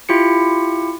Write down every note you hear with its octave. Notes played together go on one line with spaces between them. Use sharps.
E4 F4 G4 C#7